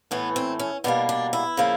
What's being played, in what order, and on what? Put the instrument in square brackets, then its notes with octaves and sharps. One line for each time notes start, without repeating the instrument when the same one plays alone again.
[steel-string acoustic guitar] A2 E3 A3 B3
C4
C#4
B2 G3 A#3 D4
D4
E4
C#3 F3 A#3